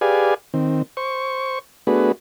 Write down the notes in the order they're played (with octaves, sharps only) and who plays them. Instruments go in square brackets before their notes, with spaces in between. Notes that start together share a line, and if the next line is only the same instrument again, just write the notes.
[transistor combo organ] G4 G#4 B4 D5 F5 G#5
D#3 C4
C5 C#6
A3 B3 D4 F#4 G#4 B4